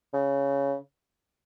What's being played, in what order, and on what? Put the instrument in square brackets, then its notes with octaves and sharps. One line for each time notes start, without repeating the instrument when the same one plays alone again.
[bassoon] C#3